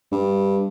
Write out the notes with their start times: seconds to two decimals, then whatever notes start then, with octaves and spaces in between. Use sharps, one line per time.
0.12 G2